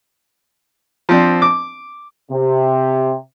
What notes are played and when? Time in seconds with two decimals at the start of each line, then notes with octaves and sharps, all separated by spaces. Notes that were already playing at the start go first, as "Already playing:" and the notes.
1.09 F3 C4 D4
1.42 D6
2.31 C3